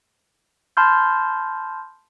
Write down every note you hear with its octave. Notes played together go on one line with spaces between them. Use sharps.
A5 B5 C6 F6 G6